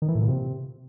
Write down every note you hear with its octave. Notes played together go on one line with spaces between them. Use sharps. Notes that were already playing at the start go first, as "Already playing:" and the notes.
D#3
E3
A2
A#2
C3